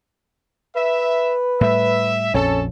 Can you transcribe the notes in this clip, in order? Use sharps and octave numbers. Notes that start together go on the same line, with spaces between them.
B4 E5
A2 G3 E5
A#1 F2 C#4 A4